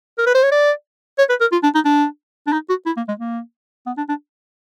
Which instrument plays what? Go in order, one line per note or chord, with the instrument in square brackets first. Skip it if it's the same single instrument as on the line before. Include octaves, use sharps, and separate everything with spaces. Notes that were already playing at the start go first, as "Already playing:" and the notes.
[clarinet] A#4
B4
C5
C#5
D5
C#5
B4
A#4
F4
D4
D#4
D4
D4
D#4
F#4
E4
A#3
G#3
A#3
B3
D4
D4